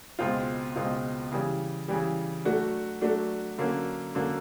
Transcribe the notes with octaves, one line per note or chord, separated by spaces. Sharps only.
C#2 B2 G#3 C4 F4
C#2 B2 G#3 C4 F4
C#3 E3 G3
C#3 E3 G3
F#3 A3 D4 F#4
F#3 A3 D4 F#4
D3 F#3 A#3 C#4
D3 F#3 A#3 C#4